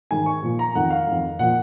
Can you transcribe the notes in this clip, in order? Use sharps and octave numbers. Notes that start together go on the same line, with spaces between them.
G#2 D#3 G#5
C#6
A#2 F3
A#5
F2 D#3 F#5
F5
F2 D#3
A#2 F3 F#5